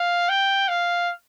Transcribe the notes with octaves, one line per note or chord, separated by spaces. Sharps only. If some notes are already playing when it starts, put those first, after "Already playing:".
Already playing: F5
G5
F5